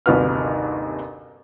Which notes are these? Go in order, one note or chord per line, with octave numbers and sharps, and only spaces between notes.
G1 D#2 C3 F#4 B4 F6